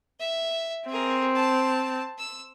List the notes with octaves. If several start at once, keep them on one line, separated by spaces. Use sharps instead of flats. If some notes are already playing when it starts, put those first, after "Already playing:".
E5
C4 G#4 A#4
A5
E6